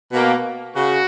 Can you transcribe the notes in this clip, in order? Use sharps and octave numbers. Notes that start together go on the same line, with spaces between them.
B2 A#3
C#3 F#4